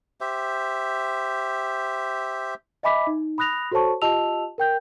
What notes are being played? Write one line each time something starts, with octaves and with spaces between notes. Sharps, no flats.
G4 C5 E5
D#5 E5 G#5 B5 D6 B6
D#4
B5 D#6 F#6 A#6 F7
F#4 A4 C5 C#5 A5 C#6
F4 G4 D#5 A5 E6 F7
A#4 G5 G6